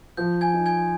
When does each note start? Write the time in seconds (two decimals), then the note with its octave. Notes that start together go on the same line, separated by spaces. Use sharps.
0.17 F3 G6
0.41 G#5 G#6
0.53 D#4
0.66 G#5 G#6